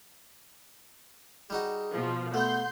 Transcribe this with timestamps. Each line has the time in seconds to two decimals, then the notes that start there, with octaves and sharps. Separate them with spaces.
1.50 G3 D#4 F#4 G#4
1.93 B2 F3
2.34 A3 B3 F#5 C6 G6